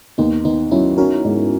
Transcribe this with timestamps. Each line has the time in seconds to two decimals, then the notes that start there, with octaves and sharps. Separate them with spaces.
0.18 D#2 B3 D#4
0.45 D#3 B3 D#4
0.71 F#3 C#4 E4
0.98 C#4 F#4 A#4
1.25 G#2